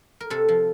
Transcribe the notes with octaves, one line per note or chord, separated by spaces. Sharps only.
A#4
C3 A4
F3